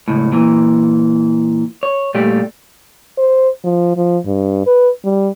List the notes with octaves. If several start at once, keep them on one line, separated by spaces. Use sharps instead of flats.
C#2 A2
A#2 E3
C#5
A#2 G3 A3 G4
C5
F3
F3
G2
B4
G3